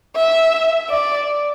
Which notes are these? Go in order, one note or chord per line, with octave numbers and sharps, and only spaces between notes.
E5
D5